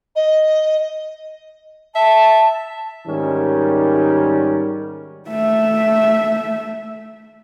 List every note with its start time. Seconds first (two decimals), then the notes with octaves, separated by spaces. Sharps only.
0.16 D#5
1.95 E5 A5
3.08 G#2 D#3 G3 C#4 A#4
5.28 A3 E5